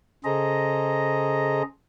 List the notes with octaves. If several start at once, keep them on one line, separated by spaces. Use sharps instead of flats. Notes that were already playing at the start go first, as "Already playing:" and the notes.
C#3 G#4 A4 C5 D#5 A#5